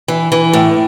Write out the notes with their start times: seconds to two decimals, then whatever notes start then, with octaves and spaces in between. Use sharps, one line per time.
0.08 E3
0.32 E3
0.53 A2